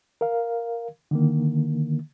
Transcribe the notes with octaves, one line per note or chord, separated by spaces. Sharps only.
A#4 F5
D3 D#3 A#3